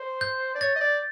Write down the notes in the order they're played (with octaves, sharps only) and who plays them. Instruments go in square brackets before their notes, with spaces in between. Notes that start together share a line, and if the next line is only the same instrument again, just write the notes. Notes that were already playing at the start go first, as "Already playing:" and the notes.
Already playing: [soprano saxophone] C5
[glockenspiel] G6
[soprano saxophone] D5
[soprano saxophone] C#5 [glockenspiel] A6
[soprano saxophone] D#5
D5